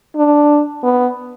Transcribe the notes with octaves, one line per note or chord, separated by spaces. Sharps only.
D4
B3